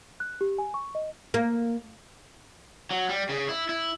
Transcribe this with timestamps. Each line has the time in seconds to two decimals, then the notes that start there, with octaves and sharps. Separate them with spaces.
0.20 F#6
0.41 G4
0.58 G#5
0.74 C#6
0.95 D#5
1.34 A#3
2.91 F#3
3.09 G3
3.29 C#3
3.49 E4
3.69 E4